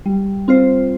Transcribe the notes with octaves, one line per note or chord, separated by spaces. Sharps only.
G3
C4 F4 C5